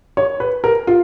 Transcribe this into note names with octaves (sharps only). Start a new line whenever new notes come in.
C#5
B4
A#4
F4